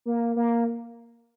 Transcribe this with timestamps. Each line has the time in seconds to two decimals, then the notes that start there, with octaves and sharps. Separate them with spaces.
0.06 A#3
0.36 A#3